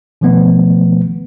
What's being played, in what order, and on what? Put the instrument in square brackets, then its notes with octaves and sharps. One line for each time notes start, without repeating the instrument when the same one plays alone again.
[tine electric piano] B2 D#3 F3 A3 B3